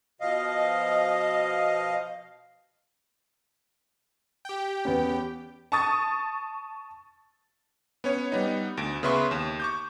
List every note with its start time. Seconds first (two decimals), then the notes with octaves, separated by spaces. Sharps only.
0.21 B2 F3 D#5 F5
4.45 G4 G5
4.85 E2 B3 C#4
5.72 A5 C#6 D#6 A6
8.04 B3 C#4 C#5
8.32 G3 B3 D#4
8.77 D2 D7
9.03 C#3 B3 B4 E5 C6 C#6
9.31 D#2 E7
9.60 C#6 D6 G6